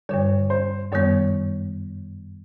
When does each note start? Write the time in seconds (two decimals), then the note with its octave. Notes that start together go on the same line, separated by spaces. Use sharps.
0.09 G2 D3 G3 C#5
0.50 C5
0.92 F#2 D#3 G3 B3 C#5